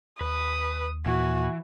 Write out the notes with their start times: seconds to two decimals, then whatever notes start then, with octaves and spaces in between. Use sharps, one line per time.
0.21 D#2 B4 D#6
1.06 A#2 E3 F#4